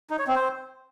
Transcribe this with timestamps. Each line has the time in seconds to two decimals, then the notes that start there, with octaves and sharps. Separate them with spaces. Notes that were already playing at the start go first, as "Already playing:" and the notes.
0.10 D#4
0.19 C#5
0.27 C4
0.36 C5